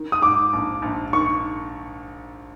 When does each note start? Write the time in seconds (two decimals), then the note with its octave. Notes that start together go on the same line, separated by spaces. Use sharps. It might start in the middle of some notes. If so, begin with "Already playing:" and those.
Already playing: D#3
0.12 D#6
0.22 G#2 D6
0.53 A#1
0.82 A#1
1.13 D#3 C#6